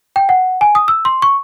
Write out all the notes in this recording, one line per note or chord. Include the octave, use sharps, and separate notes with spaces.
G5
F#5
G#5
D#6
E6
C6
C#6